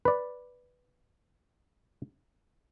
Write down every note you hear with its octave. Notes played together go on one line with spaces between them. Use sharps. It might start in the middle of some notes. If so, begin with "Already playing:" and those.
B4 D5